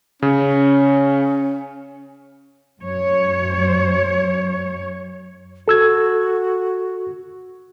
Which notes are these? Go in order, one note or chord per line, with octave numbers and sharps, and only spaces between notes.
C#3 C#4
F#2 C#5
F#4 A4 E6 G#6